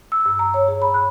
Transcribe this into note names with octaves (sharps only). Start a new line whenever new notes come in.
E6
G2
A#5
C#5
G#4
B5
F#6